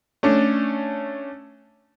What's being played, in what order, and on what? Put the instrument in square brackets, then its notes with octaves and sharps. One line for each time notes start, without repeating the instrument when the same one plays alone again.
[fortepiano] A3 C#4 D4